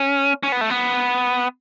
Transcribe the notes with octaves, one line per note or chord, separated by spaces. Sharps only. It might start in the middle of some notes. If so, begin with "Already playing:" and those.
Already playing: C#4
C#4
B3
A3
B3